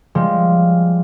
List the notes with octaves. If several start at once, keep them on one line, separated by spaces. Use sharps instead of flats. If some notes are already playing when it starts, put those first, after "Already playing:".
F3 G3 G#3